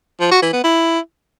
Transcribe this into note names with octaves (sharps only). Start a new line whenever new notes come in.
F3
F#4
E3
B3
E4